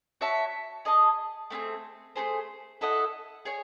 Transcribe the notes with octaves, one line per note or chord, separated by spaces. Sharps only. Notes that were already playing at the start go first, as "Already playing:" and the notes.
F#4 C#5 E5 A5
G#4 D#5 A5
A3 C4 E4 G#4
A3 D#4 G#4 C5
E4 A4 D#5 F#5
G#4 C#5 G#5